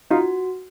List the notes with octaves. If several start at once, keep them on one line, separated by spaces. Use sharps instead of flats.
D#4 F4 F#4